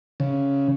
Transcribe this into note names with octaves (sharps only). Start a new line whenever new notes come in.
C#3